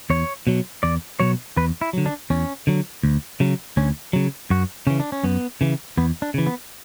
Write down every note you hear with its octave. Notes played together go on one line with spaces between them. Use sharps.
E2 C#5
B2 F#3
E2 D5
B2 F#3 C#5
E2 B4
E4
D3 F#3
D4
E2 C#4
D3 F#3
D2
C#3 F#3
D2 C#4
C#3 F#3
F#2 F#4
C#3 E3 C#4
D4
C#4
F#2 B3
C#3 E3
E2 B3
D4
C#3 E3
B3